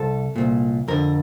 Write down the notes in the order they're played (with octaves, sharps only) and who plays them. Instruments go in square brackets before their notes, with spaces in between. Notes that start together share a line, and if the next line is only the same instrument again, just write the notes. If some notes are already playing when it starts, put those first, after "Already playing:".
Already playing: [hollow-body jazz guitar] C2 A4
C2 A#2
F2 D3 A#4